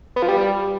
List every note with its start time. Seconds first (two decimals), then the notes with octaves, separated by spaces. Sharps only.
0.16 B3
0.22 F3
0.29 G3